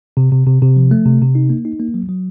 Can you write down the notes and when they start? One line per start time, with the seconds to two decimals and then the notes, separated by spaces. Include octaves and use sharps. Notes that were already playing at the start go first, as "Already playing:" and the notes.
0.17 C3
0.33 C3
0.47 C3
0.62 C3
0.76 F3
0.91 A3
1.06 C3
1.21 C3
1.35 D#4
1.50 A#3
1.65 D#4
1.80 A#3
1.94 F#3
2.09 F#3